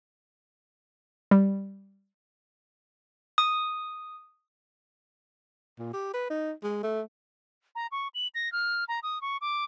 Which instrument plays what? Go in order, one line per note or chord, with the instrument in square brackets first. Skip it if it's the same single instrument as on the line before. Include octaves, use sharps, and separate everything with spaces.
[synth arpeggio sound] G3
[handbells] D#6
[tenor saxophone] A#2
G4
B4
D#4
G#3
A3
[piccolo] A#5
C#6
F#7
A#6
F6
A#5
D#6
C#6
D6